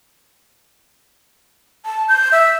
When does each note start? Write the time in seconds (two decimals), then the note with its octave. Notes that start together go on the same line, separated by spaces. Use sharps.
1.85 A5
2.08 G6
2.32 E5